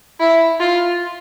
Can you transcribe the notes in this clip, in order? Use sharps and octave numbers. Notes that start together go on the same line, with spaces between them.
E4
F4